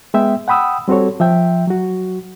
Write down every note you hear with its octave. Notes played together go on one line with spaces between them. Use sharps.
G#3 B3 E5 G5
F#5 G5 B5 D#6 E6
G3 C4 F#4 A4 C#5
F3 E5 G5
F#3 F#4